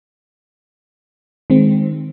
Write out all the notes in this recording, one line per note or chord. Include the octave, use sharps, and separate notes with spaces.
D#3 G#3 C4